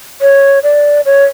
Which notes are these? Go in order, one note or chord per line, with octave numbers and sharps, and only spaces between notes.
C#5
D5
C#5